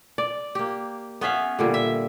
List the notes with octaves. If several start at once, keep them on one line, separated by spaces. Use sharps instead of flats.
D5
A#3 G4
B3 C#4 E5 F5
A#2 D3 G3
E5